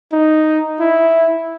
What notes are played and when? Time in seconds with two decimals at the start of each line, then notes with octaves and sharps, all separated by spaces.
0.12 D#4
0.80 E4